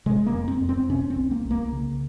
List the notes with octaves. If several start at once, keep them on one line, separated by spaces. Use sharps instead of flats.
C3 G#3
A#3
F2
C4
F2
C4
C3 C#4
C4
C2
A#3
C2
A#3
C#3